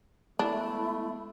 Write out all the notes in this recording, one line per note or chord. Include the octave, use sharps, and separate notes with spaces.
G#3 A3 B3 D4 E4